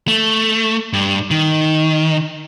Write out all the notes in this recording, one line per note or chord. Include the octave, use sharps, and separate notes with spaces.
A3
G2
D#3